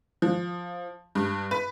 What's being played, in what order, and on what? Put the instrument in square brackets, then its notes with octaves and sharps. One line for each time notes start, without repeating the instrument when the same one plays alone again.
[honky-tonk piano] F3
G2
B4